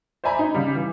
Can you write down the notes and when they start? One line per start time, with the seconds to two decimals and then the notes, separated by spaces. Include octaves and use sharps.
0.24 C5 D5 E5 G#5 A#5 B5
0.39 D#4
0.55 C#3 G3
0.76 E3